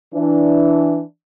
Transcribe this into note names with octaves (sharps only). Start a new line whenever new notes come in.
E3 D4